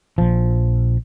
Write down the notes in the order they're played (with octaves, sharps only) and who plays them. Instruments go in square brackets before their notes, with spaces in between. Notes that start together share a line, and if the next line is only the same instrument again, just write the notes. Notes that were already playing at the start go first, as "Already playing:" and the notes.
[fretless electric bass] A#1 F3